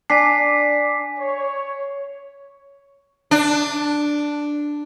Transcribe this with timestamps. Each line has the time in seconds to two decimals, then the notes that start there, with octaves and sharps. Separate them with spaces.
0.10 D4 G#5 B6 C7
1.18 C#5
3.31 D4